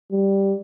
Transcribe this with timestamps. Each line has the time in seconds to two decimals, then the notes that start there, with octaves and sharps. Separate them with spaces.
0.12 G3